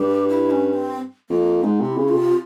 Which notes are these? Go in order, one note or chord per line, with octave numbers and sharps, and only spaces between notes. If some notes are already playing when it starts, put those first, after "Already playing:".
Already playing: G2 G4
E4
C#4
C4
F2 A#3
G#2 G#3
C3 E4
C#3
F4
C3